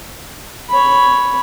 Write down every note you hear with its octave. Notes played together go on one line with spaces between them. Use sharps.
C#5 B5